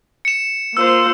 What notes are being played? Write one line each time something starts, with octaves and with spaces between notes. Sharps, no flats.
C#7 E7
A#3 F4 C5 E6